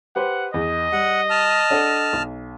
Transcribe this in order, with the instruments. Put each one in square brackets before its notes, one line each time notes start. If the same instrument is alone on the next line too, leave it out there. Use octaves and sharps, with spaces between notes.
[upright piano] G4 B4 C5 [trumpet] F#5
[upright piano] E2 [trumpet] D#5
[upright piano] G3 [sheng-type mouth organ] F#5
[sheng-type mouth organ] A5 F6
[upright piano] D4 A4 F#5
B1